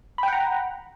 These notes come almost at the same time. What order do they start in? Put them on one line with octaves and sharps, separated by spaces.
B5 G5 F#5 A#5